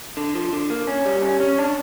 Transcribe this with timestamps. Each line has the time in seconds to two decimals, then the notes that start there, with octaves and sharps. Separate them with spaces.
0.17 D3
0.35 F3
0.53 D3
0.70 A#3
0.87 C#4
1.05 G3
1.22 C#4
1.40 C#4
1.58 D4